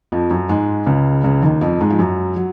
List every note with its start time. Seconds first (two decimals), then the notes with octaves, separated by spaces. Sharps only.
0.12 F2 F3
0.30 F#2 F#3
0.49 G#2 G#3
0.86 C#2 C#3
1.24 C#2 C#3
1.43 D#2 D#3
1.61 F2 F3
1.80 G#2 G#3
1.90 F3
1.99 F#2 F#3
2.36 F#3